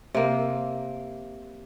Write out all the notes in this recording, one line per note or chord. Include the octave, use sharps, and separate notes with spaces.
C3 A#3